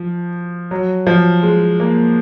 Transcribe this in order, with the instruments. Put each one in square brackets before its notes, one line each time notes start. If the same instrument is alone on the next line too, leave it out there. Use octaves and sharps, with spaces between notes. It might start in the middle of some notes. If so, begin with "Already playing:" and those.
Already playing: [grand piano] F3
F#3
F3
G#3
A#3